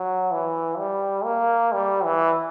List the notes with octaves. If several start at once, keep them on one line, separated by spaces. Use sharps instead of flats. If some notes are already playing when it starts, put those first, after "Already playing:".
Already playing: F#3
E3
G3
A#3
G3
E3